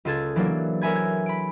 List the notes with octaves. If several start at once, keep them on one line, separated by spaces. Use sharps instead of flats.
C#2 F4 G#4 A4 A5 G#6
E3 F#3 A#3 D4
A#4 C#5 E5 G#5 B5 G#6
F#6 G#6
B5 D7